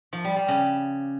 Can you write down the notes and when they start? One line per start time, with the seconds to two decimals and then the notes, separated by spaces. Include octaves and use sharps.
0.13 F3
0.24 G3
0.36 G3
0.48 C#3